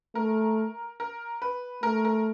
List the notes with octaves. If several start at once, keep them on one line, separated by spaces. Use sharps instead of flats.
A3 A#4
A#4
B4
A3 A#4
A#4